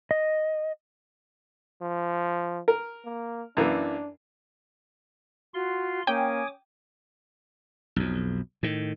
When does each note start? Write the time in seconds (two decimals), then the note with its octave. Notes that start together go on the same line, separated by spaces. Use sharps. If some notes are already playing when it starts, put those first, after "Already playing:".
0.11 D#5
1.82 F3
2.68 A#4
3.05 A#3
3.57 F#2 E3 A#3 D4
5.54 F4 F#4 C6
6.07 A#3 C#4 G5 G#5 D6 D#6
7.96 B1 F2
8.63 A2 D#3